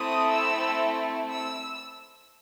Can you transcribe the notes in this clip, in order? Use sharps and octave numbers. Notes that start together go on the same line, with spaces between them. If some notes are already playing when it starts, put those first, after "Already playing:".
Already playing: A3 C4 E4 A4 D#6
E6
E6